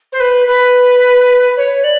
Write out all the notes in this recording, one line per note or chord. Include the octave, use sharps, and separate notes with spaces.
C5
B4
B4
C#5
D5